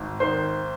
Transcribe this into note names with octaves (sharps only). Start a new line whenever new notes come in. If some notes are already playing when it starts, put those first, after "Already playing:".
Already playing: G#1
D#3 C5